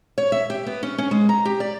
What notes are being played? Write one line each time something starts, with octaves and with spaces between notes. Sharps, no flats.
C#5
E5
G4
B3
C#4
C#4
G#3
A#5
G4
D5